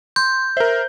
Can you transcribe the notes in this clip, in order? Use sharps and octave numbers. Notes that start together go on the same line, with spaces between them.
C6 G6
A#4 C5 E5